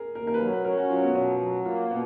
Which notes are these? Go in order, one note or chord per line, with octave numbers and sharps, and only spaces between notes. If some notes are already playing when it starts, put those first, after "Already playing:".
Already playing: G#4 A#4
D#2 A#4
A#4
B4
F#3 A#4
B4
C#4 A#4
F#4
F#3 F4
B3
B2 C#4
F#3
A#3 F4
B2 B3